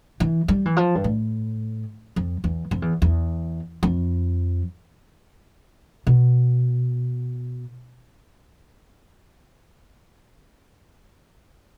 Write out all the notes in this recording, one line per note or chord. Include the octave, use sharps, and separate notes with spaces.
E3
G3
E3
F3
G2
A2
F2
E2
F2
E2
E2
F2
B2